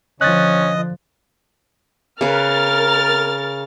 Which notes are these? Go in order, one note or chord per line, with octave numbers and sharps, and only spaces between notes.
D3 F3 C#4 D#5 F#6 A6
C#3 A#4 B4 F6 A6